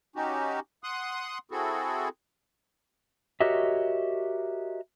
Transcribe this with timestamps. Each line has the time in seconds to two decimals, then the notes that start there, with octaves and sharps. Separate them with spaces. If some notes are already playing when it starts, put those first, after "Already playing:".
0.16 C#4 D#4 F#4 G4
0.84 F#5 C6 D#6 F#6
1.51 C4 E4 F#4 G#4 A4
3.40 F#4 G4 A#4 C#5 D#5 E5